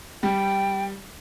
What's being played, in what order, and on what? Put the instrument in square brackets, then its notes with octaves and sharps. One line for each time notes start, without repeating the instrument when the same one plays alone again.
[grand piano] G3 [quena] G5